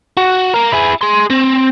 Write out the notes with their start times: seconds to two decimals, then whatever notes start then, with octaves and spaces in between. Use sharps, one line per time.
0.17 F#4
0.54 A#3 A#4
0.72 E4 G#4
1.02 G#4 C6
1.30 C4